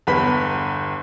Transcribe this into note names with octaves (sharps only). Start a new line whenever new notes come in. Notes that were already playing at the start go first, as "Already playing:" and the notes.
G1 E2 B4 B5 B6